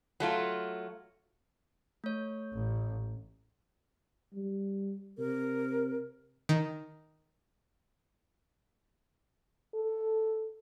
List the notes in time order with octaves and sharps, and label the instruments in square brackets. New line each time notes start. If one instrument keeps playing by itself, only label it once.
[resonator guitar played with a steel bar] F#3 A3 F4
[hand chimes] A3 C#5
[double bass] A1
[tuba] G3
[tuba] C3 [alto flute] A#4
[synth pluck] D#3
[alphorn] A4